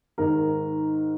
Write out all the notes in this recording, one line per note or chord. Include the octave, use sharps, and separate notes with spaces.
G#2 D#3 A#4